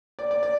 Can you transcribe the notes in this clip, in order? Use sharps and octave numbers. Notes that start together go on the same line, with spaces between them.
D5
D5
D5